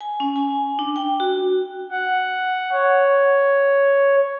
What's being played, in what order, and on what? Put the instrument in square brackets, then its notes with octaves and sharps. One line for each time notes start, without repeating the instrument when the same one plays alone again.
[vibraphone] G#5
C#4
G#5
D4
G5
F#4
[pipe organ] F#5
C#5